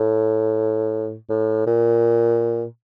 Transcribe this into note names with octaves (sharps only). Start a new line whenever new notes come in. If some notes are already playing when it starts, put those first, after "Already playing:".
Already playing: A2
A2
A#2